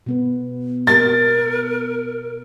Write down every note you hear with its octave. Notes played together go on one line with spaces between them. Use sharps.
B2 B3 B4
A#3 A#4 A6